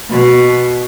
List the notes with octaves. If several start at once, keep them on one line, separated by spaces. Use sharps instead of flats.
B2